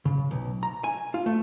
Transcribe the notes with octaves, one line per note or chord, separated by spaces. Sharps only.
C#3
B1
A#5
G#5
F4
A3